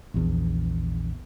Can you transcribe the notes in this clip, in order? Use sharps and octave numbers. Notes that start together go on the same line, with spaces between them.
A#1 E2